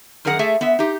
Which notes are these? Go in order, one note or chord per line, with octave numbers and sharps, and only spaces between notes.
F#2 D#3 G#4 A#4 F#5
A3 G#4 A4 E5
B3 E5
D#4 G4